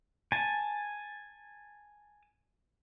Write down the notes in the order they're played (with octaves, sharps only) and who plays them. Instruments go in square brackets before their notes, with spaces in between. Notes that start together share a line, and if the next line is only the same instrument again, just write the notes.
[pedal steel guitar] G#5 A5